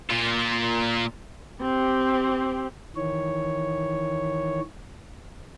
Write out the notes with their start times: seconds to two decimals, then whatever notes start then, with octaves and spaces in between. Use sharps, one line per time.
0.10 A#2 F4
1.61 C4 G4
2.96 D#3 E3 C#5